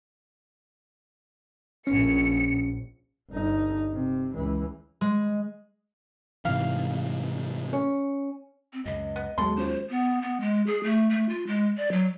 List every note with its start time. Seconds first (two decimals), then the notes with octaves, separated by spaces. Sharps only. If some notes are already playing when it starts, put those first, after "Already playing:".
1.87 A#1 C#4 C#7
3.31 G1 D#4
3.93 C3
4.35 C#2 E3
5.01 G#3
6.45 G#2 C3 E3 F5
7.73 C#4
8.73 C4
8.86 C#2 F#2 D#5
9.16 B3
9.38 D#2 F#3 G#3 B3 A4 C6
9.58 C#4 F4 C5
9.90 B3
10.22 B3
10.41 G#3
10.67 G#4
10.83 A3
11.10 A3
11.29 F4
11.47 G#3
11.78 D5
11.92 F#3